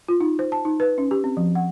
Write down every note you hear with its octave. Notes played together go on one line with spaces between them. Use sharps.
F4
D#4
C5
A5
D#4
B4
C#4
G4
C4
F3
F#5